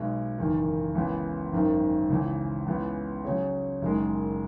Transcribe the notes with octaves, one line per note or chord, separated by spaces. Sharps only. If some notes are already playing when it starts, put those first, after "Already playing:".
Already playing: B1 B2 G#3
F#1 E2 D#3
C#2 C#3 E3 B3
G#1 F#2 D#3
C#2 C#3 E3
C#2 C#3 E3 B3
C#3 F#3 C#4 G#4 C#5
F#1 F#2 D#3 G#3